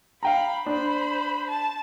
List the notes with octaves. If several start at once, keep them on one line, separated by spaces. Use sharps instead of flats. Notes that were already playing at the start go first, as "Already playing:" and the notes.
F5 G5 A#5 B5
D4 C5 B5
A5